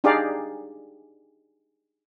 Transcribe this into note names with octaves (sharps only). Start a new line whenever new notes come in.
D4 D#4 G4 G#4 D5 F5